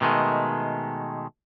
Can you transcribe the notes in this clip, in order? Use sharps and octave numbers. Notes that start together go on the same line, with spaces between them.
B2 D#3 G#3 A3